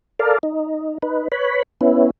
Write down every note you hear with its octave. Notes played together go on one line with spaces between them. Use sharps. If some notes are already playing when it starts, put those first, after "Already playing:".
A4 A#4 D5 F5
D#4
D#4 B4
B4 C#5 B5
B3 C#4 E4